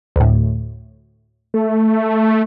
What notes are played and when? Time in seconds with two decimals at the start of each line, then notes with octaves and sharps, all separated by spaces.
0.16 D2 A2
1.54 A3